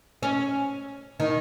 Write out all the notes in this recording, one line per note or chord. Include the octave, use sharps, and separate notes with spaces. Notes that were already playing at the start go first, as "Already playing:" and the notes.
C#4
D#3